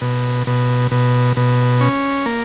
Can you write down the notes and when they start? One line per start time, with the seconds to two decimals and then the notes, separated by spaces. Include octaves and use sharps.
0.01 B2
0.47 B2
0.91 B2
1.37 B2
1.81 C#4
2.26 A#3